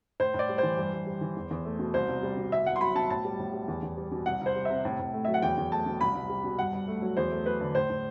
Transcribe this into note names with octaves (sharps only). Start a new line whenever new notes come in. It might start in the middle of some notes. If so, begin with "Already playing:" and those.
A2 C5
A2
D5
G3
E3 C5
G2
G2
G3
E3
E2
E2
A3
B2
C2 C5
C2
G3
B2
C2 E5
C2 F#5
C6
F#3 B5
B2 A5
A2 A5
G3
A2
G3
E2
E2
G3
B2
C2 F#5
C2 C5
G3
C3 E5
A2
A2
A3
F#3 E5
F#5
E2 G5
E2
A3 A5
B2
C2 B5
C2
G3
B2
G2 F#5
G2
A3
F#3
E2 C5
A3
F#3 B4
D3
A2 C5
A2